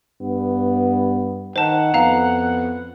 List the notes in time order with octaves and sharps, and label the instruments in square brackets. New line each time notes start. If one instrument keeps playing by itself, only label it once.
[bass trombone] G2 [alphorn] B3
[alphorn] D#3 [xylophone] C5 A5 [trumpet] F#5
[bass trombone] F2 [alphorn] B3 [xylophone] F5 A#5